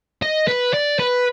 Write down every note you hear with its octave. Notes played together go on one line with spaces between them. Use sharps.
D#5
B4
D5
B4